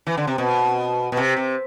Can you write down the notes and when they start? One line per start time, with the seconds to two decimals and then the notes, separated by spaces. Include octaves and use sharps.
0.07 E3
0.17 D3
0.27 C3
0.38 B2
1.12 B2
1.17 C3
1.37 C3